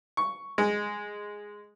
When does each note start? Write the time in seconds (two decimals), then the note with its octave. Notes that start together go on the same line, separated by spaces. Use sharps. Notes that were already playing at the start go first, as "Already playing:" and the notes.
0.17 C#6
0.58 G#3